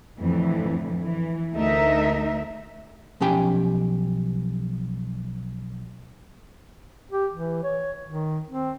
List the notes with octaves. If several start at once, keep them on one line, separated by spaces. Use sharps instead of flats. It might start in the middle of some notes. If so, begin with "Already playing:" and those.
F2 A2 D3 E3
E3
D2 A3 D#4 A#4 E5
B1 F3 C#4 G4 G5 G#5
G4
E3
C#5
D#3
C4